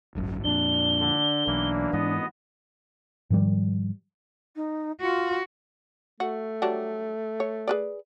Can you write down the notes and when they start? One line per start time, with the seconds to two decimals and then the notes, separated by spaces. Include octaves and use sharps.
0.15 D1 G#1 F#2
0.44 F2 A#2 D4 G7
1.00 D3
1.47 B1 E3 A#3
1.93 G#2 E3 B3 D#5
3.30 G#2 D#3 F3 G3
4.56 D#4
5.01 F4 F#4
6.20 A3 F#4
6.62 F#3 G3 D4
7.40 C#5
7.68 G#4 B4 D5